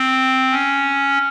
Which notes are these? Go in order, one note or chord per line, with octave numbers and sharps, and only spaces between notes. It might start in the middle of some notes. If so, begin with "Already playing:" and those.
Already playing: C4
C#4